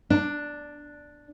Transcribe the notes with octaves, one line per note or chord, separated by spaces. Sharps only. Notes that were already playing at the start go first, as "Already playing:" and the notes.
D4